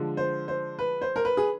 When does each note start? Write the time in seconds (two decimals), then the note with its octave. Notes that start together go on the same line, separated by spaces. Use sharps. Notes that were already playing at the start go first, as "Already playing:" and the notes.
Already playing: D3 F3 G#3
0.17 C5
0.48 C5
0.79 B4
1.01 C5
1.16 A#4
1.25 B4
1.37 G#4